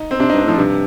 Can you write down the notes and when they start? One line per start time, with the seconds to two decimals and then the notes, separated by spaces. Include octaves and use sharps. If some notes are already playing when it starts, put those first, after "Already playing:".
Already playing: D#4
0.11 C4
0.20 C3 D4
0.30 G2 D#4
0.38 D4
0.45 A2 F3
0.58 G2 C3